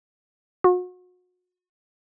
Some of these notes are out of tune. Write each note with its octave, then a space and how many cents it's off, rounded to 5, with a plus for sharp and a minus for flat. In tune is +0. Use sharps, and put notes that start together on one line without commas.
F#4 -35